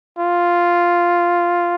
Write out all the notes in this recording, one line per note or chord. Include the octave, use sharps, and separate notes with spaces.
F4